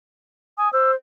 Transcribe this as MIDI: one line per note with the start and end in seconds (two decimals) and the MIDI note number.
0.58 0.70 80
0.58 0.68 87
0.73 0.95 72
0.73 0.91 88